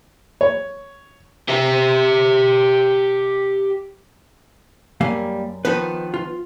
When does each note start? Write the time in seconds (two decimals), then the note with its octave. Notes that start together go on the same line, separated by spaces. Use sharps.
0.41 C#5
1.49 G4 E5
5.01 F#2 G3 A#3 F5
5.65 D#3 F3 B3 D#4 B4
6.14 F4